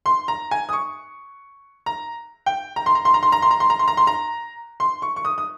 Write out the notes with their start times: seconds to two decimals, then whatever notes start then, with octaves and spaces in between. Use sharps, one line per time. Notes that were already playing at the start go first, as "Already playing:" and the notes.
0.06 C6
0.28 A#5
0.51 G#5
0.69 D#6
0.73 C#6
1.86 A#5
2.46 G5
2.76 A#5
2.86 C6
2.95 A#5
3.05 C6
3.14 A#5
3.23 C6
3.32 A#5
3.42 C6
3.51 A#5
3.60 C6
3.70 A#5
3.79 C6
3.88 A#5
3.97 C6
4.07 A#5
4.80 C6
5.02 C#6
5.16 C#6
5.25 D#6
5.38 D#6